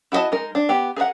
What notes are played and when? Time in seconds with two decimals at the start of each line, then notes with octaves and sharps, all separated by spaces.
0.12 E4 F#4 A4 D#5 A5
0.32 G#3 D#4 A#4
0.55 D4
0.69 B3 G4
0.96 G#4 A#4 B4 F#5